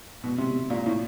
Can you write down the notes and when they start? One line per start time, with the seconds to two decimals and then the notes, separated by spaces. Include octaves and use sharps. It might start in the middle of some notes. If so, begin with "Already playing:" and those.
0.24 B2
0.38 C3
0.70 A#2
0.86 A2